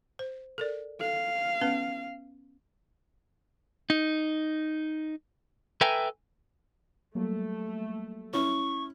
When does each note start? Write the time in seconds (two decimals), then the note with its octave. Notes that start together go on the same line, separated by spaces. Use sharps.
0.19 C5
0.58 A4 A#4 D5
1.01 A4 F5
1.61 B3 C#4 B4
3.90 D#4
5.81 A4 B4 E5 G5 G#5 A#5
7.15 F#3 G3 A3 A#3
8.33 C#4 E4 C#6